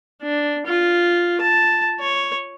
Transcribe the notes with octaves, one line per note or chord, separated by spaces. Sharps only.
D4
F4
A5
C#5